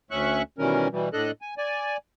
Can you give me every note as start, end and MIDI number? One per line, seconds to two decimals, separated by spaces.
0.11 0.42 38
0.11 0.42 61
0.11 0.42 76
0.11 0.42 85
0.11 0.42 90
0.58 0.88 47
0.58 0.88 51
0.58 0.88 52
0.58 0.88 55
0.58 0.88 61
0.58 0.88 70
0.92 1.09 47
0.92 1.09 52
0.92 1.09 55
1.13 1.31 45
1.13 1.31 62
1.13 1.31 69
1.13 1.31 75
1.13 1.31 90
1.42 1.54 80
1.58 1.97 74
1.58 1.97 80